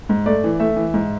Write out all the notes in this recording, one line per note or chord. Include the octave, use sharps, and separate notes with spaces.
G#2
A3 D5
E3
A3 E5
E3
G#2